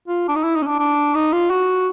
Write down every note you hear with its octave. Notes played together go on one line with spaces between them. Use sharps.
F4
D4
D#4
E4
D#4
C#4
D4
D4
D#4
F4
F#4